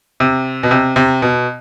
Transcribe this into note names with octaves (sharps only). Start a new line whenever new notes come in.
C3
B2
C3
C3
B2